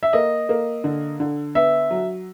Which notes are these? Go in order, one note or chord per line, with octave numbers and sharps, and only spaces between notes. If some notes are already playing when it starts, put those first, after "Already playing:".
E5
A#3 D#5
A#3
D3
D3
B3 E5
F#3